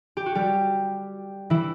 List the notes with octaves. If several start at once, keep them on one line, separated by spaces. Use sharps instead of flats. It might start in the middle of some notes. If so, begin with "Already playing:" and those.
G4
F#4
G3 G4
E3 E4